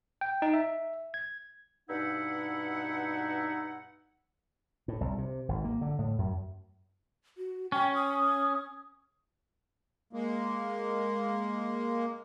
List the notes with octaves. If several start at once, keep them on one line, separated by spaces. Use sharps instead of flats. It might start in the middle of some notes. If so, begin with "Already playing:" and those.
G5
D#4
E5
G#6
G2 B2 D#4 E4 F#5
A2
C2
C3
G#1
A#3
D3
A2
F#2
F#4
C#4 G5
D#6
G#3 A#3